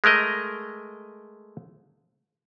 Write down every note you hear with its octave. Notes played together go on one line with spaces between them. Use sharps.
G#3 A3 A#4 D#5